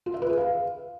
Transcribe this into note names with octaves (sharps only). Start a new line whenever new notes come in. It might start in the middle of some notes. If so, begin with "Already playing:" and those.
F4
E5
B4
G#4
F5